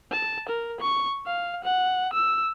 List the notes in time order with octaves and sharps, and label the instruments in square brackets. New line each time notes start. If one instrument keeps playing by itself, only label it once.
[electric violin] A5
A#4
C#6
F5
F#5
E6